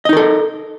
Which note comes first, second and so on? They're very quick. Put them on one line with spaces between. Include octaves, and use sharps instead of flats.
D#5 D#4 A#4 A4